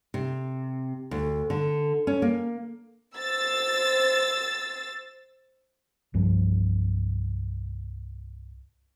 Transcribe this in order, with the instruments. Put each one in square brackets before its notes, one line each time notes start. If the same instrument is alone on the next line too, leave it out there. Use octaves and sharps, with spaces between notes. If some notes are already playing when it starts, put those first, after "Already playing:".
[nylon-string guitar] C3
D2
D3
C#4
A#3
[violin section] C5 E6 A6
[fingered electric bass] C2 G2 F3